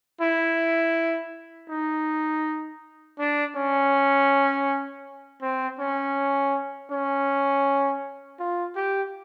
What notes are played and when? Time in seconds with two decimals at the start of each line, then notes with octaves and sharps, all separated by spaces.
0.21 E4
1.70 D#4
3.19 D4
3.56 C#4
5.42 C4
5.79 C#4
6.91 C#4
8.39 F4
8.76 G4